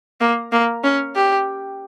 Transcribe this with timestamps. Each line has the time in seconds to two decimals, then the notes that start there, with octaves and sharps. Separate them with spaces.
0.21 A#3
0.52 A#3
0.84 C#4
1.16 G4